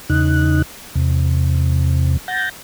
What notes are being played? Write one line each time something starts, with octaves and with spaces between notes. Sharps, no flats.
E2 C#3 D#4 F#6
E2 C3
F#5 G6 A6 A#6